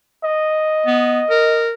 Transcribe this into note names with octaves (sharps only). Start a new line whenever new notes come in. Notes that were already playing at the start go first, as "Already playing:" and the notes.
D#5
B3
A#4